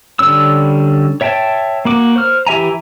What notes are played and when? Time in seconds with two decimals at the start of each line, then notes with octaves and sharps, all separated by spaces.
0.19 D3 G3 C#4 E6
1.21 C#5 E5 G5 A5
1.85 A#3 F#4 D6
2.16 C5 F6
2.47 E3 G4 E5 G#5 A#5